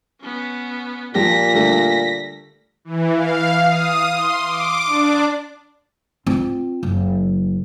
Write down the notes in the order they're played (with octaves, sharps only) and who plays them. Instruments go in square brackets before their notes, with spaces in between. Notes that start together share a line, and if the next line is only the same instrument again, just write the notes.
[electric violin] B3 C#4
[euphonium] A#2 [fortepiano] F3 G4 [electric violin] A#6 B6
[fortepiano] D3 G3 A3
[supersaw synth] E3
F5
D#6
C6
D6
D4
[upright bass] C4 F4
F#1